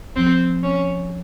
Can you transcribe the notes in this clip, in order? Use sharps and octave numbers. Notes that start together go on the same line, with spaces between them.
F3 C4
C#4